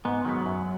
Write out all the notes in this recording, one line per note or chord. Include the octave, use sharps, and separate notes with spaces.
G#2 B3
D#3 F#3 G#3 B3
F#2